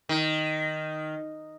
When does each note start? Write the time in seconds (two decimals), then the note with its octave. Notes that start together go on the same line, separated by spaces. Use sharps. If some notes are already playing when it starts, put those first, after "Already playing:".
0.09 D#3